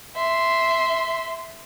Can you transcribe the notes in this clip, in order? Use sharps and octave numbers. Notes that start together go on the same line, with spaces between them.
E5 C6